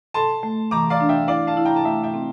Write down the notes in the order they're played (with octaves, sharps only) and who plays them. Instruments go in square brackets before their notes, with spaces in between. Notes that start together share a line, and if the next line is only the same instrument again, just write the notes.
[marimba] A4 [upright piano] A5 C6
[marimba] A3
[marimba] E3 [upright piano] A#5 D6
[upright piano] D5 F5
[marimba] D4
[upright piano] E5 G5
[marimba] E4 [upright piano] D5 F5
[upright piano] F5 A5
[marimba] E4
[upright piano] G5 A#5
A5
[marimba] A3 [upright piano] E5 G5
[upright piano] E5 G5
[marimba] C4